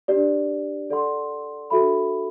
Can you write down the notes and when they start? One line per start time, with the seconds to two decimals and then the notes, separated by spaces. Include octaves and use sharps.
0.08 D4 G4 D5
0.90 A4 D5 F#5 C6
1.70 D4 F#4 A4 E5 B5